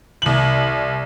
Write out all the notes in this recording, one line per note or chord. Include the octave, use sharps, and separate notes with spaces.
C2 F#7